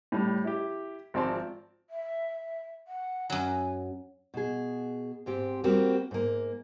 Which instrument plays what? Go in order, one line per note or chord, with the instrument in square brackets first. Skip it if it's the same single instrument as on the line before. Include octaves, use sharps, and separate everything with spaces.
[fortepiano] A2 G3
E4 G4
G#1 F3 C4 D5 A5 C6
[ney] E5
F#5
[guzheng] F#2 F#3 [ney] G#5
[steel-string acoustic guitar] B2 G#4
G#2 C4 G4
G3 A#3 C4 F#4 G4
G#2 A#3